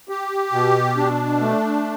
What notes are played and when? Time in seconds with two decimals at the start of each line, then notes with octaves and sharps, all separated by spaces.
0.09 G4
0.53 B2
0.97 D4
1.41 A3